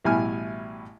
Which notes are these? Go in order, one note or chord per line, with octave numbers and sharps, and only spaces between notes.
A1 B2 G3 E4 G#5 F6